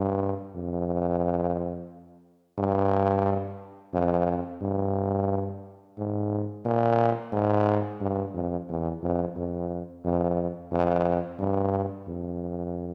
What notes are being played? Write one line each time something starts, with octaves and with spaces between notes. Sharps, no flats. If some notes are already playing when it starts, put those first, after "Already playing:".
Already playing: G2
F2
G2
F2
G2
G#2
A#2
G#2
G2
F2
E2
F2
F2
F2
F2
G2
F2